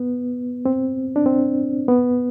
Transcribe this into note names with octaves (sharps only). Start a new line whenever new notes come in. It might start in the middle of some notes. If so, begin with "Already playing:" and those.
Already playing: B3
C4
D4
C4
B3